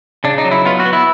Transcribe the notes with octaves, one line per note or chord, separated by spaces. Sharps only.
C#3 D4
D#4
F#3
E4
B3 F4
F#4
B3
E4